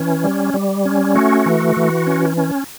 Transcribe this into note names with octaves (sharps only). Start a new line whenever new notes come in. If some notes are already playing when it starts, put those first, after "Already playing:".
Already playing: E3 C#4
G3
G3
C#4
A3 F#4
E3
E3
C#4
C#4